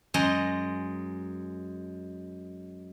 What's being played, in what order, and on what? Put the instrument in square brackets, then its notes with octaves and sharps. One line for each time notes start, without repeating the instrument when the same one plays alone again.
[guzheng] F#2 G#3 D#5 A#5 C6